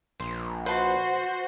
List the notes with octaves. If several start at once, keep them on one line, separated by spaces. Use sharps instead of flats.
A#1 C5
F#4 B4 C5 A5 C6